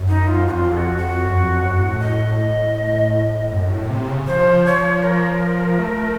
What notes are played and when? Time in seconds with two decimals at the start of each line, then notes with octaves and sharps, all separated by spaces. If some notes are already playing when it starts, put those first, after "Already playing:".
Already playing: F#2
0.08 D#4
0.28 F4
0.47 F2 F#4
0.51 F4
0.72 A4
0.77 F#4
0.98 F#4
1.23 F#2
1.42 F2
1.61 F#2
1.81 A2
2.00 D#5
3.51 F#2
3.70 A2
3.90 C3
4.08 C#3
4.27 F3 C5
4.66 C#5
5.03 A#4
5.79 A3